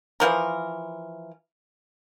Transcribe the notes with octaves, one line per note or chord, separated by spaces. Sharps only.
E3 F3 A#4